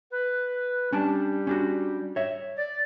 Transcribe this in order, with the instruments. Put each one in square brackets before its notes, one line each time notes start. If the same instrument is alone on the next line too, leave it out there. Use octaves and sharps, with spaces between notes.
[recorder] B4
[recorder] G3 [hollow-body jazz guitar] C#4 D4 A5
[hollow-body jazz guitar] C#4 D4 F#4
C#5 E5
[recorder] D5